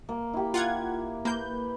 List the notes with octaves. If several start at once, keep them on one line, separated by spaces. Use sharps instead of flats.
A#3
E4 G4
F4 F#5 G#6
A#3 B4 G6